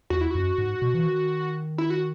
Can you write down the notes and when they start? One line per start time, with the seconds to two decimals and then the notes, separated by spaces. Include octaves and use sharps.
0.10 E2 F#4
0.21 E4
0.31 F#2 F#4
0.58 G#2
0.82 B2
0.94 E3
1.06 D#3
1.78 E4
1.90 F#4